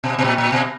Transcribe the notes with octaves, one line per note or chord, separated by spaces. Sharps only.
B2
B2
A#2
A#2
B2